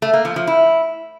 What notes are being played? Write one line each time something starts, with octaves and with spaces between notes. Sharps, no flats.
A3
A#3
F3
F3
E4